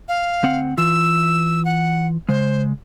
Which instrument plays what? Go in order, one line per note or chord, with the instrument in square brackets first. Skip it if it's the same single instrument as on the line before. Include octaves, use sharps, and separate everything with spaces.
[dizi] F5
[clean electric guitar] D2 C4 F#5
[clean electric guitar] E3 F4 [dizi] E6
[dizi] F#5
[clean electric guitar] C#3 G#3 [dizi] C5